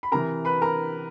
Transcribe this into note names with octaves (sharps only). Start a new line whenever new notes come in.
B5
C3 E3 A#4 A#5
B4 B5
A#4 A#5